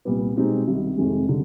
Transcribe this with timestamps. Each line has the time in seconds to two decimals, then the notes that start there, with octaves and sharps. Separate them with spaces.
0.05 C2 A#2 G3 B3
0.36 B2 G#3 C4 D#4 G4
0.67 C2 C3 D#3 G3
0.98 F2 C3 D#3 G#3
1.29 D3 G3